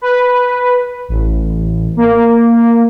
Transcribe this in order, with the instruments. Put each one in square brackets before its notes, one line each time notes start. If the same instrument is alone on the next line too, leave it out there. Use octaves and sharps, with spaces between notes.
[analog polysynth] B4
A1
A#3